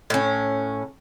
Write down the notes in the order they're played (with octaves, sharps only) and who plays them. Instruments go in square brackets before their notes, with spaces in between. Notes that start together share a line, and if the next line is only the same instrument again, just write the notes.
[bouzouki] A2 C#4